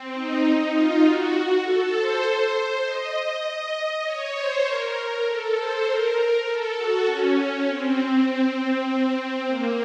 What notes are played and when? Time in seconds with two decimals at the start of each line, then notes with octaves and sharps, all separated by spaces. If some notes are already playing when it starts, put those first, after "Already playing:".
Already playing: C4
0.13 D#4
0.72 F4
1.03 F#4
1.63 A4
1.93 C5
2.23 C5
2.84 D#5
3.44 D#5
4.04 C#5
4.35 C5
4.65 A#4
5.26 A4
5.56 C5
5.85 A#4
6.46 A4
6.76 F#4
7.06 C#4
7.67 C4
7.97 C4
8.58 C4
9.48 A#3